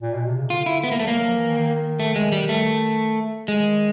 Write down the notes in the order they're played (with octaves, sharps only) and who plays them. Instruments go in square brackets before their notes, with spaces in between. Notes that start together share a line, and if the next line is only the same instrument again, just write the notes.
[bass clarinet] A#2
B2
C3
C#3
[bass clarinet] D3 [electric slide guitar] F4
[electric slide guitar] E4
B3
A#3
A3
[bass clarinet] G3
[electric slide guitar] A#3
[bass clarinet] F#3
F3
E3
D#3
[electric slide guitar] A3
G#3
G3
A3
[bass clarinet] D#3 [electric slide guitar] G#3